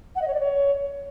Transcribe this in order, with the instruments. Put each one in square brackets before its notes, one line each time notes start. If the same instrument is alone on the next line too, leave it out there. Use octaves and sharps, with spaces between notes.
[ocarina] F#5
D#5
C#5
D5
C#5